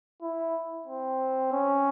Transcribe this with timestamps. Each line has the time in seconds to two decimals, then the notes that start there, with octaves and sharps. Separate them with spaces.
0.22 E4
0.87 C4
1.52 C#4